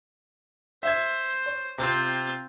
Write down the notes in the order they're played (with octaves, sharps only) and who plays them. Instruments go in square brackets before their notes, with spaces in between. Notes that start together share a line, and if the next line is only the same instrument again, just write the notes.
[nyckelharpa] C5 [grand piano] E5 G#6
[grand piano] C#5
[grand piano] C3 [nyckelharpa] C4 F4